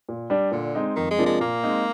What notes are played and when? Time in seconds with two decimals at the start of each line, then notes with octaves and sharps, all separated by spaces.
0.09 A#2
0.30 G3 D4
0.52 A#2 D3
0.75 G#3 C4 D#4
0.96 F2 D#3
1.11 G#3
1.19 C3 F3 A#3 D4
1.26 G#3
1.40 A#2 A#3
1.63 G#3 C4 D#4